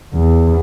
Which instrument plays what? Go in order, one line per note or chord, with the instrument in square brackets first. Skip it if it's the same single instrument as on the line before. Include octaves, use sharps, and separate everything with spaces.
[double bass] E2